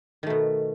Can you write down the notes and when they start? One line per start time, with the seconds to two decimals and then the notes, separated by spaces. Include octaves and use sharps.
0.23 D#3
0.27 A3
0.30 B2